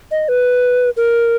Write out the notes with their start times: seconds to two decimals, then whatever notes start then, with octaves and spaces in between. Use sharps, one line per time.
0.11 D#5
0.29 B4
0.97 A#4